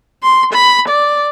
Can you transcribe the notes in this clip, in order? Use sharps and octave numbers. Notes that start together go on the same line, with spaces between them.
C6
B5
D5